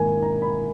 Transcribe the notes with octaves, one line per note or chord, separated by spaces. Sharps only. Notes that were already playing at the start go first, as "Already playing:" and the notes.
Already playing: G#2 D#3 A#3 G#5
A#5
B5